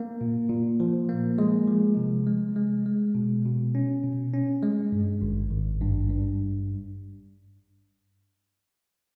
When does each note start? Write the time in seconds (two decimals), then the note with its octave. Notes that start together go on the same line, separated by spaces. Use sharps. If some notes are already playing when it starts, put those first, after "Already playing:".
Already playing: A#3
0.21 A#2
0.49 A#2
0.80 F3
1.09 A#3
1.38 G#3
1.67 F3
1.97 C3
2.27 G#3
2.56 G#3
2.86 G#3
3.15 B2
3.45 B2
3.75 C#4
4.04 B2
4.34 C#4
4.63 G#3
4.92 G2
5.22 G#1
5.51 G#1
5.81 G2
6.10 G2